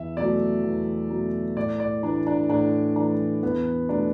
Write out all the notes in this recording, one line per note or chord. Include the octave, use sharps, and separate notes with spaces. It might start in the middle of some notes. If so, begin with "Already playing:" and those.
Already playing: E2 E5
B2 F#3 A3 D5
E2
B2 F#3 A3
A2 D5
D5
E3 A3 D4
D4
A2 D4
E3 A3 D4
E2 B3
B2 A3 D4